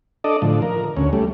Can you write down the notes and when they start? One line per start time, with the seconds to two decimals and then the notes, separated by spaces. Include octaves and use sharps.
0.24 D4 A4 D5 D#5
0.42 A2 D3 F3
0.62 A#4
0.97 D2 C#4
1.13 G3 A3